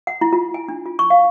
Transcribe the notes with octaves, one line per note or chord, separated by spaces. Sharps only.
F#5
E4
F4
G#5
D4
F4
C#6
F5